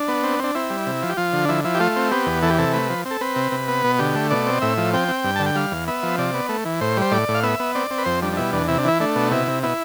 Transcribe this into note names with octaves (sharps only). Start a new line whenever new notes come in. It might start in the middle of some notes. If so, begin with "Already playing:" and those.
Already playing: D4
B3
C4
C4 D4
C4 E4
G3
C3
F3
G4
F3 F4
D3
D4
F3 E4
F3 E4
G4
A3 F4
C4
B3 G4
E2
E3 A4
G4
C3 A4
A3 B4
F3
C4
A4
C4 B4
C3
C3
B3
B2
D3 G4
A3
B2 D5
C4
A2 E5
F3
C4 G5
C4
G2
D3 A5
G5
G3 F5
E2
B3 E5
F3
C3 D5
B3
A3
E3
A2 C5
G3 C5
A2 D5
A2
F5
B3 E5
B3
C4 D5
C4
B4
F2 C5
G3 D4
D4
B2 E4
E2 D4
C3 E4
D4
E3 E4
A3 D4
B2
C3 E4
C3
B2 E4